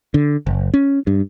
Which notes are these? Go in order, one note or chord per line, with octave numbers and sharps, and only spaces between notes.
D3
F#1
C#4
G2